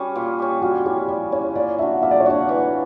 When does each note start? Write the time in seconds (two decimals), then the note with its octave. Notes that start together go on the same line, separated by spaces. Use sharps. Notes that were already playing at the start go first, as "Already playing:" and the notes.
Already playing: G3 C#4 F#4
0.16 A#2
0.39 G3 C#4
0.62 G3 F#4
0.85 C#4 E4 G4
1.08 G3 D5
1.32 C#4 E4 C#5
1.56 A#3 D5
1.78 D4 F#4 E5
2.02 A#3 E5
2.11 D5
2.20 C#5
2.26 D4 F#4 D5
2.49 E3